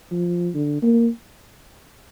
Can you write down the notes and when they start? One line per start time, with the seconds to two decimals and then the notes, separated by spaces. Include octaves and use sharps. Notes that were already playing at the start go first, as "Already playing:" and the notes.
0.11 F3
0.54 D3
0.82 A#3